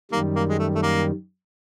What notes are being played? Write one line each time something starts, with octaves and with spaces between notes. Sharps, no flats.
F#2 D#3 G3 A#3
A#3
G#3
A3
A3
A#3